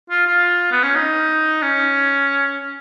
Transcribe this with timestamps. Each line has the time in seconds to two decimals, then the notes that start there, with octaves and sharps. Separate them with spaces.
0.10 F4
0.27 F4
0.71 B3
0.83 C#4
0.95 D#4
1.62 C#4